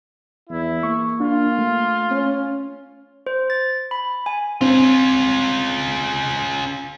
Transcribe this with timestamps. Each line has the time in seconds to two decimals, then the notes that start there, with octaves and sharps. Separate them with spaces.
0.49 E2 E4
0.83 A#3 C#6
1.20 D4 F4
1.59 A3
2.10 C#4
3.27 C5
3.50 A6
3.91 B5
4.26 G#5
4.61 C4 C#4 F4